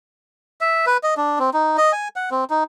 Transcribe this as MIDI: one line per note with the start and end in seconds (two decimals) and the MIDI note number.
0.61 0.85 76
0.87 0.97 71
1.03 1.14 75
1.17 1.39 62
1.39 1.50 60
1.54 1.77 63
1.77 1.92 75
1.92 2.08 80
2.16 2.30 78
2.31 2.44 60
2.50 2.64 63